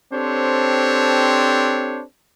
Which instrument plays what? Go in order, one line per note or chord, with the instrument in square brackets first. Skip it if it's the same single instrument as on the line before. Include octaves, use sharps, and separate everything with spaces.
[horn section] C4 D4 G4 A4 C5 C#5